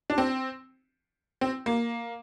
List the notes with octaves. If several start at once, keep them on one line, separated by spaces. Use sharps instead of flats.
D4
C4
C4
A#3